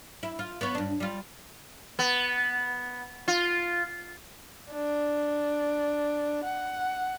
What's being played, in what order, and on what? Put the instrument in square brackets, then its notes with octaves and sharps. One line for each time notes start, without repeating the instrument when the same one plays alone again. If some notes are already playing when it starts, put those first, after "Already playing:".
[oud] E4
F4
B3 C#5
G2 D4
G3 F4
[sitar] B3
F4
[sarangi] D4
F#5